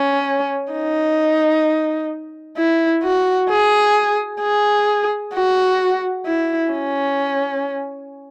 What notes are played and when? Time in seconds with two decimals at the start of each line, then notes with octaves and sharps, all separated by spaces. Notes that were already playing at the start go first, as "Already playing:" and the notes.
Already playing: C#4
0.72 D#4
2.57 E4
3.03 F#4
3.50 G#4
4.41 G#4
5.34 F#4
6.26 E4
6.72 C#4